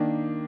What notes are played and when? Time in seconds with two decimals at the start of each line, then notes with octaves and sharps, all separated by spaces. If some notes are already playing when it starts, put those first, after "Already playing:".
Already playing: D#3 A#3 D4